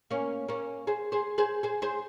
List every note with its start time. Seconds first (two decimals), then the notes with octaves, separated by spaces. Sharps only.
0.11 A#3 C#4
0.48 A#3 C#4
0.87 G#4 C5
1.12 G#4 C5
1.38 G#4 C5
1.63 G#4 C5
1.82 G#4 C5